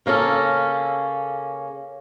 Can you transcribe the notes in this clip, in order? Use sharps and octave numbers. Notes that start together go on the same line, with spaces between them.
C#3 A#3 C#4 A4